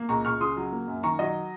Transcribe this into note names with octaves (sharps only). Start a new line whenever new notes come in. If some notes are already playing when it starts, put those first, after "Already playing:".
Already playing: A#3
C#2 A#5 C#6
C#2 C#6 F6
C#3 C6 D#6
F#3
A#3
F#2
D#3 A#5 C#6
F#3 D#5